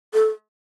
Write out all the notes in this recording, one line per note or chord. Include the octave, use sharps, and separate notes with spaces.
A4